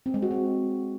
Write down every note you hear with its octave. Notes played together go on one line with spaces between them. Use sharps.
C4
G#3
F#4
C4